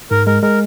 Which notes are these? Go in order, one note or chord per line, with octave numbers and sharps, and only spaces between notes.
G#2 A#4
G#3 A#4
G#3 A#4